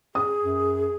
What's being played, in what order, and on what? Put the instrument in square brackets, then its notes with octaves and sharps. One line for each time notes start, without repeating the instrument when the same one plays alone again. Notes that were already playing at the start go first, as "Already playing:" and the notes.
[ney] G#4 [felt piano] D#6
[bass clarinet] F#2